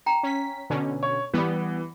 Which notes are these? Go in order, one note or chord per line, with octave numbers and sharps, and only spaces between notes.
G5 A#5
C#4 B6
B2 D3 C#4
C#5
E3 G3 B3